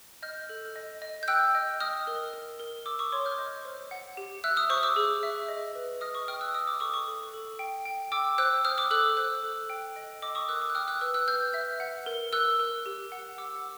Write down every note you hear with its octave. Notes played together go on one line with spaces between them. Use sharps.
D#5 F6 G6
A4
D#5
D#5
G6
G5 E6 F#6
D#5
D#5 D#6 F6
A#4
A#4
A#4
A#4 D6 E6
C#6 D#6
C#5 C6 D6
F6 G6
D#5
C5
F#5
G4
E5 E6 F#6
D#6 F6
C5 C#6 D#6
D6 E6
G#4
E5
D#5
B4
D#5 D#6 F6
C#6 D#6
G5 D#6 F6
E6 F#6
D#5 D#6 F6
D6 E6
A4 C#6 D#6
C#6 D#6
A4
A4
G5
G5
G5 D6 E6
C5 E6 F#6
C5 D#6 F6
D6 E6
A4 E6 F#6
C5 E6 F#6
A4
G5
D#5
D#5 D6 E6
C#6 D#6
A#4 E6 F#6
D6 E6
F#6
G5 D#6 F6
E6 F#6
B4 E6 F#6
E6 F#6
B4 F6 G6
E5
F#5
A#4
A#4 E6 F#6
A#4
G4
F#5
F#5 D6 E6